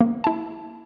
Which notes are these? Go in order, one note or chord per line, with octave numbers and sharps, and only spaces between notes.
A#3
E4 A5